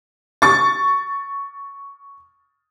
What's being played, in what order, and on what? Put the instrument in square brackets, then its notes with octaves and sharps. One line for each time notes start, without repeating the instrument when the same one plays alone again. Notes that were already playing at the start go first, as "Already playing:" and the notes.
[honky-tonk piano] C#6 A6